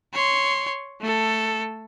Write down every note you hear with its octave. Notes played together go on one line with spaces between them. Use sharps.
C#5 C6
A3 A4